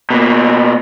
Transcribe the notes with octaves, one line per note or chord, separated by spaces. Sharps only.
B2 A#3